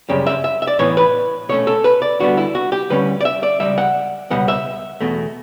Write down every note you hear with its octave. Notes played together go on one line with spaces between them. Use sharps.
F#2 C#3 G3 G4
E5
E5
E5
D5
A2 E3 B3 C#5
B4
B2 A3 C#4 C#5
A4
B4
D5
D2 D3 G3 B3 F#4
E4
F#4
G4
D2 D3 G3 C#4 B4
D5
E5
D5
C#2 C#3 G3 E5
F#5
C#2 B2 G3 B3 F#5
E5
E2 B2 A3